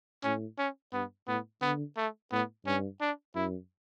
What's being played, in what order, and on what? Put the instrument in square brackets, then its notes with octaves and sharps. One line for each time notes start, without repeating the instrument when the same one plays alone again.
[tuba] A2 [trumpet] C#4
[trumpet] C#4
[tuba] G2 [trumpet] B3
[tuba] A2 [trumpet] B3
[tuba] D3 [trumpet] B3
[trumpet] A3
[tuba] A2 [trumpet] B3
[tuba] G2 [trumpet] C#4
[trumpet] D4
[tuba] F#2 [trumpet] E4